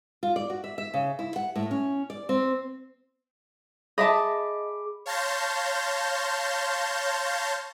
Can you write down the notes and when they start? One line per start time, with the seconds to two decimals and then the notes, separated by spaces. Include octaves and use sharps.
0.23 F4
0.36 D5
0.50 F#4
0.64 E5
0.78 E5
0.94 C#3
1.19 E4
1.36 F#5
1.56 A2
1.71 C#4
2.10 D5
2.29 C4
3.98 G#4 D#5 E5 A5 B5 D6
5.06 C#5 F5 A5 C6 G6 A#6